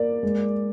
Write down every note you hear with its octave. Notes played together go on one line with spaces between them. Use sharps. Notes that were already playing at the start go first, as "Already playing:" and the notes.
Already playing: A#3 D5
G#3